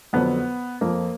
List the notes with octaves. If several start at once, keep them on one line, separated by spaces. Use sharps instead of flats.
F2 D3 F#3 B3
F2 F3 A#3